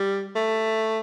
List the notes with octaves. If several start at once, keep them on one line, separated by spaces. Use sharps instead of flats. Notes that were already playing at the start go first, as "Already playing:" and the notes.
Already playing: G3
A3